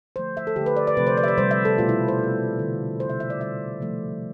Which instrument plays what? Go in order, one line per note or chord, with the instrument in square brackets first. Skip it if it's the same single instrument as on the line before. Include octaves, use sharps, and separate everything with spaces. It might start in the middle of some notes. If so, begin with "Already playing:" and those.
[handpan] D3 F3 A3 C5
E5
A4
D3 G4
A3
B4
D5
D5
C3 F3 A3 B4
C5
D5
E5
D5
C3 G3 C5
E5
A4
B2 A3 F4
E4
C5
B2
A3
D3 G3
G3 C5
C3 E5
E5
D5
D3 G3 E5
C3 F3 A3